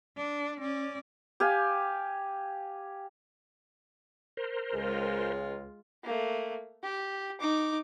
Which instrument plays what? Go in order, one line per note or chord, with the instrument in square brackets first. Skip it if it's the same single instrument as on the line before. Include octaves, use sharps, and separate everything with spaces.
[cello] D4
C#4 D5
[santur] G4 F5 G#5
[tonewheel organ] A#4 C5
[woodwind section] C#2 [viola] G#3 F4
[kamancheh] A3 A#3
G4
D#4 D6